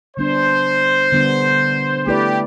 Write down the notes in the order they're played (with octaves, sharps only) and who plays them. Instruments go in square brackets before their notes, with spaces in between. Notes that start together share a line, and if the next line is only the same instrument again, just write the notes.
[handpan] D3 G3 B3 D4 [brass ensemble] C5
[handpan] D3 G3 B3 D4
[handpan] A3 E4 B4 D5 [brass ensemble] G4